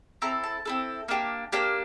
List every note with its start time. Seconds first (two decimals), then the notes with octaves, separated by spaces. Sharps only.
0.22 C4 E4 A4 A#5
0.44 A5
0.65 C4 E4 A4
1.08 A#3 D4 G4
1.52 A#3 D4 G4